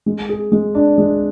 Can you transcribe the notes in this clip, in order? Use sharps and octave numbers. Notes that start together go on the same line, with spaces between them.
G#3
G#4
G#3
D4
G#3